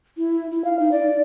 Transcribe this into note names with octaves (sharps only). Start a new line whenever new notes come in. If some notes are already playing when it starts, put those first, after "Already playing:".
E4
E4
F5
D#4
D5